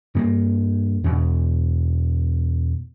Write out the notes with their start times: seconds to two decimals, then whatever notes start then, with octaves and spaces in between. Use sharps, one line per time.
0.15 G2 A#3
1.04 E2 B2